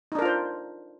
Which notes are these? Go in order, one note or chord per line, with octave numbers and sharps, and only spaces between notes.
D4 D#4 F4 A#4 C5